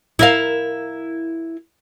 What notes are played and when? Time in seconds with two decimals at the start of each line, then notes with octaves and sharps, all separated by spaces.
0.19 E4 A#4 F5